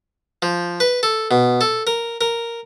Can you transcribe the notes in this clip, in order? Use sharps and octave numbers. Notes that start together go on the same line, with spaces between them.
F3
B4
A4
B2
A4
A#4
A#4